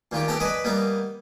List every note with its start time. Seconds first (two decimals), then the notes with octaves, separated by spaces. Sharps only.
0.12 A#2 D#3 F4 G4
0.28 B3 G4 A4 G5 A5 A#5
0.40 B4 D5 D#5 G#5 B5
0.64 G3 A#3 B3 D#4